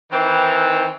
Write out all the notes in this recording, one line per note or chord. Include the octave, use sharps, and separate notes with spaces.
D#3 E3 C4